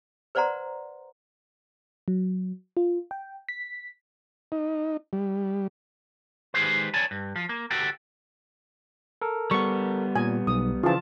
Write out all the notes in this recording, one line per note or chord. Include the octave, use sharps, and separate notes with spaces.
B4 C5 D5 F#5 A#5 C6
F#3
F4
G5
B6
D#4
G3
D#3 G#3 G4 G#4 B4 C5
C#5 D5 G#5 A5
G2
F3
A#3
D2 F#4 G4 A4 G5
A4 A#4
G3 B3 C#6
A#2 G#5
B1 D#6
C#3 E3 F3 F4 A5